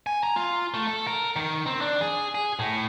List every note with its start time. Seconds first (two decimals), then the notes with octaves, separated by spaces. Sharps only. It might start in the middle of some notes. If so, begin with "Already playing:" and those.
0.07 G#5
0.23 A#5
0.36 F4
0.74 A3
0.87 A4
1.07 A#4
1.36 D#3
1.66 C4
1.81 D4
2.01 G#4
2.35 G#4
2.59 A2